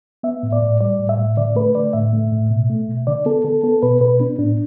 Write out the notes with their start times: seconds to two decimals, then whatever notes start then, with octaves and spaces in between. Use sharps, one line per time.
0.23 B3 E5
0.43 A2
0.52 D5
0.62 A2
0.80 G3 D5
0.99 A2
1.09 E5
1.18 A2
1.37 D3 D5
1.56 A3 B4
1.75 D3 D5
1.93 A2 E5
2.13 A3
2.32 A2
2.50 B2
2.70 A3
2.88 B2
3.07 D3 D5
3.26 B3 A4
3.44 D3 A4
3.63 B3 A4
3.82 B2 B4
4.01 B2 B4
4.20 B3 D4
4.39 A2 D4